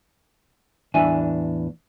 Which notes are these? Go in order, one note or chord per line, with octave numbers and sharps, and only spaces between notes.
E2 A2 E3 D4 E5 G#5